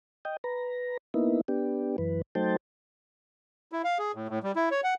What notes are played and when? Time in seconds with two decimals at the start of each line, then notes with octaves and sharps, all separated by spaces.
0.25 D#5 G5
0.44 B4 A#5
1.14 A#3 B3 D#4 E4
1.48 B3 D4 G4
1.98 F#2 E3 B4
2.35 F#3 A3 D#4 C5 G5 A5
3.72 E4
3.84 F5
3.99 G#4
4.15 A2
4.29 A2
4.43 G3
4.56 E4
4.71 C#5
4.84 F#5